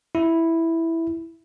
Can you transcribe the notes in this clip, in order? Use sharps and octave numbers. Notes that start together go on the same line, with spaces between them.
E4